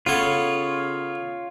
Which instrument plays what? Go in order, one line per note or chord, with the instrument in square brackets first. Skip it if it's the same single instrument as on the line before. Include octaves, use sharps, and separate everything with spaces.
[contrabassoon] C#3 [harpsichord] B3 A4 [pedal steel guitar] F4 C#5